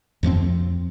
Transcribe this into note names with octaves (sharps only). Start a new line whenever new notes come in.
F2 F3 G3 C4